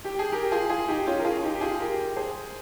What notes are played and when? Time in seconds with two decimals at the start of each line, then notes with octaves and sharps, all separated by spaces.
0.04 G4
0.19 G#4
0.32 G4 A#4
0.51 F4 G#4
0.69 F4 G#4
0.88 D#4 G4
1.07 C#4 F4
1.20 A#4
1.25 F4 G#4
1.43 D#4 G4
1.55 G4
1.61 F4 G#4
1.80 G4 A#4
2.16 G#4 C5